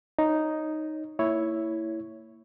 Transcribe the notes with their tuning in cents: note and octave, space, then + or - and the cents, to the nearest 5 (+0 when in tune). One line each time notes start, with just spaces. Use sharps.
D#4 +0 C#5 +0
A#3 -30 E4 +0 C#5 +0